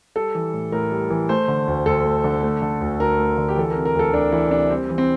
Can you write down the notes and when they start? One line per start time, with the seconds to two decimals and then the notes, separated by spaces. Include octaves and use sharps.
0.16 G3 A4
0.35 E3
0.53 A2
0.72 A2 A#4
0.91 G3
1.10 E3
1.29 A3 C5
1.48 D3
1.67 D2
1.86 D2 A4
2.05 A3
2.24 D3
2.43 A3
2.62 D3
2.81 D2
3.00 D2 A#4
3.19 A3
3.38 D3
3.48 G4
3.56 E3 A4
3.70 A#4
3.76 C3
3.85 A#4
3.94 D2 A4
4.13 D2 D4
4.32 E3 E4
4.51 C3 D4
4.70 G3 C4
4.89 E3
4.98 C4